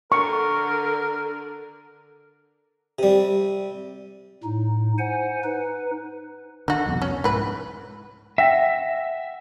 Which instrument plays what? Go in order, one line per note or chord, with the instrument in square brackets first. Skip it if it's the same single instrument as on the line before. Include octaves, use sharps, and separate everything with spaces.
[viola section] D3 [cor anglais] A#4 [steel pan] C#6
[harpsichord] C3 G3
[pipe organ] A2 D#4
C5 F#5 G#5
D#4 B4
[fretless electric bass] D3 [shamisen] D#4 F#4
[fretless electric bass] C2 F2 B2
[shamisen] C#4
[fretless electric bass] G#2 [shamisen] E3 B4
[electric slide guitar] E5 [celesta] F#5 G5 A#6